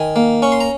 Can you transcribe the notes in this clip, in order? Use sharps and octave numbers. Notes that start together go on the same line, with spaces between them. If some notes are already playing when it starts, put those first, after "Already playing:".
Already playing: D#3 G#5
A#3
C#4 C#6
C6
A#5